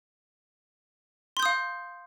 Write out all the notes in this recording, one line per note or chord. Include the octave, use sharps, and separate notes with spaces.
F5 C6 D#6 G6